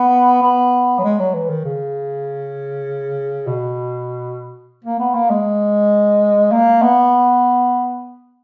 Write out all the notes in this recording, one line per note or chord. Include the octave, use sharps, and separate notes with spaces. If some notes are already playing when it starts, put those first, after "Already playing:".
Already playing: B3
B3
F#3
G#3
F#3
E3
D#3
C#3
B2
A#3
B3
A#3
G#3
A#3
B3